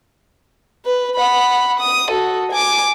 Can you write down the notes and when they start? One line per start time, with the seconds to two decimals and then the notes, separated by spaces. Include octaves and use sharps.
0.85 B4
1.16 F#5 B5
1.79 D#6
2.10 F#4 A4
2.51 G#5 D6